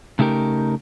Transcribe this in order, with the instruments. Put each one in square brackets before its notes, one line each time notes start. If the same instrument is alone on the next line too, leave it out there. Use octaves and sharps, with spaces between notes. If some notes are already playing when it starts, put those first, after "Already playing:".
[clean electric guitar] C#3 A3 D#4 G4 A#4